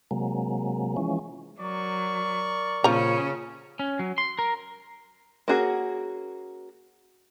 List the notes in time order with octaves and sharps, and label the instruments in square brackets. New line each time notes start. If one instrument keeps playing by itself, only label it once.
[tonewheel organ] C3 F#3 G#3 A#3
E3 F3 G#3 C#4
[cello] F#3 [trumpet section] A#4 D5 C#6
[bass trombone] A#2 [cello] C#3 C#4 [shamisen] F3 A#5
[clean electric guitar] C#4
F#3
C6
A#4
[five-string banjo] A#3 C#4 F#4 G#4